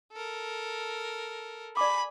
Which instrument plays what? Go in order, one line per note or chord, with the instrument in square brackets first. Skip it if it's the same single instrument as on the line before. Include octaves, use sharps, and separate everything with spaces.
[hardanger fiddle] A4 A#4
[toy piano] D5 D6 [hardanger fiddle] G#5 [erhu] B5